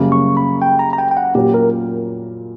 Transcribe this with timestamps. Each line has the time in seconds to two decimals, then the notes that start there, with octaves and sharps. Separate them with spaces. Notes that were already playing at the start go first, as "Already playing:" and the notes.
Already playing: F#2 C#3 G3 A#3
0.12 C#6
0.37 B5
0.62 G5
0.79 A#5
0.93 A#5
0.98 G5
1.11 G5
1.17 F#5
1.35 A#2 F#3 A#3 C#4 G4
1.54 A#4